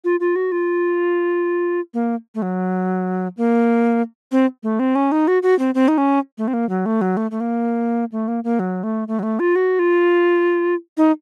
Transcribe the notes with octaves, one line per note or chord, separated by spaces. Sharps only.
F4
F4
F#4
F4
A#3
A3
F#3
A#3
C4
A3
C4
C#4
D#4
F#4
F#4
C4
C4
D#4
C#4
A3
C4
A#3
F#3
A3
F#3
A3
A3
A#3
A3
A#3
A#3
F#3
A3
A3
F#3
A3
F4
F#4
F4
D#4